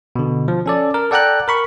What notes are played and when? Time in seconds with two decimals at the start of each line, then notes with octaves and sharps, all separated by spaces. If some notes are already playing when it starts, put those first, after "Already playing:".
0.16 B2 D3
0.48 F3
0.66 C#4 A4 D5
0.94 A#4
1.11 A4 D5 F#5 G5 A#5 F#6
1.48 A#4 B5 C#6